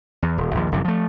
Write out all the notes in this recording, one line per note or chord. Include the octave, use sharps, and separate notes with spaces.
E2
D#1
A#1 D#2
G1 F#2 C3 E3
F3 A3